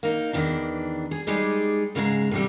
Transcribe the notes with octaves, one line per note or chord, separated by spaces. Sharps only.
A#3 D#4
E2 A2 D#3 E3 D4
G#4
G3 G#3 D#4 G#4 D5
G#2 C#3 G#3 A4 A#5
A2 C3 G3